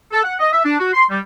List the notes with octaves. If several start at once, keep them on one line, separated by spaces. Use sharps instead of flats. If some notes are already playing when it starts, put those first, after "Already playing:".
A4
F#5
D#5
E5
D4
F#4
C6
G3